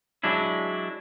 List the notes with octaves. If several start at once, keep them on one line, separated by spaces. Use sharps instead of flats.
F#3 G#3 D4 E4